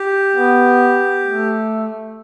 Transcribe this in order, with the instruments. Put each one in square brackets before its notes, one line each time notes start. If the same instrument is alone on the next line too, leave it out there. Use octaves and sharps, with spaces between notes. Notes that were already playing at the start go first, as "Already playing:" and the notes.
Already playing: [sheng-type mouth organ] G4
[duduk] B3
A3